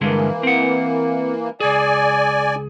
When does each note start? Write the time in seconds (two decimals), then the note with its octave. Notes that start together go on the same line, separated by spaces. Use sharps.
0.01 G2 D3 E3 G#3 A#3
0.43 C4 F#5
1.60 C#2 G#4 D5 G#5